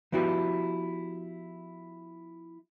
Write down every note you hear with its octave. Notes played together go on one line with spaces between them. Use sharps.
F3 B3 E4 F#4 G4